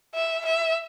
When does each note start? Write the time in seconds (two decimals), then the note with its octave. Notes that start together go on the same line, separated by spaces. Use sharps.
0.14 E5
0.45 E5